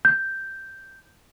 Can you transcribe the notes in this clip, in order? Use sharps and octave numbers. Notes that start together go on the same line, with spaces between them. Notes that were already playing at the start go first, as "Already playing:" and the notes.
G6